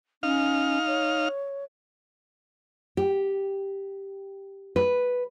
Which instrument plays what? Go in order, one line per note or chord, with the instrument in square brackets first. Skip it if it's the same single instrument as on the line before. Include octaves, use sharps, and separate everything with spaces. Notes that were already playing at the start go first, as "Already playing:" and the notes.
[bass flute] C#4 [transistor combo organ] D#4 F5 F6
[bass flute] C#5
[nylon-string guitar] G4
B4